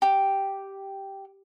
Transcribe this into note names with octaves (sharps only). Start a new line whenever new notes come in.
G4